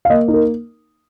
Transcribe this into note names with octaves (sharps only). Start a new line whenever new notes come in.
F5
A#3 D#5
D#4
A#4